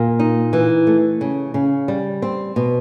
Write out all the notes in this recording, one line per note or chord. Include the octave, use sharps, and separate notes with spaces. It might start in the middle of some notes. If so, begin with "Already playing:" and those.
Already playing: A#2 A#3
D#4
E3
A3
C#3
C#3
G3
C4
B2